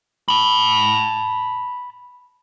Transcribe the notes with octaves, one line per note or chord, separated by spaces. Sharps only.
A5 B5